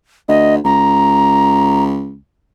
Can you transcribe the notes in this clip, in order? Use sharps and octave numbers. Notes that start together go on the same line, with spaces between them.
D2 D#5
C#2 A#5